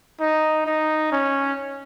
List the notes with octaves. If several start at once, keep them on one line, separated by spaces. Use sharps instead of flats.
D#4
D#4
C#4